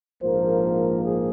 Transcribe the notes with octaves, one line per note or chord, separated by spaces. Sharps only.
A#1 G#2 F3 A#3 A#4 C5
G#4